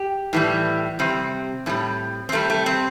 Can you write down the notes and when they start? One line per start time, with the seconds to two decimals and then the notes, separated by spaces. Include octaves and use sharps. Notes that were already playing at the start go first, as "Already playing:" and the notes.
Already playing: G4
0.33 A2 E3 G3
0.99 C3 G3 C4
1.66 A2 E3 G3
2.29 C4
2.32 C3 G3 A3
2.50 A3
2.66 C4